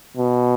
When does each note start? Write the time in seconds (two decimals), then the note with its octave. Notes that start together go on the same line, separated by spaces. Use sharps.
0.17 B2